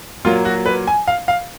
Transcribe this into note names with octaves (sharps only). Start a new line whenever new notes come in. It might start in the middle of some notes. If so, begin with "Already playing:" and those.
A#2 F#3 A#3 F4
F#4
B4
G#5
F5
F5